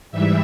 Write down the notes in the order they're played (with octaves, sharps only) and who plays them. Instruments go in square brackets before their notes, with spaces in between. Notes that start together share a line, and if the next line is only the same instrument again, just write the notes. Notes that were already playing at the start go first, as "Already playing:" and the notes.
[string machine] G#2 E3 G3 E5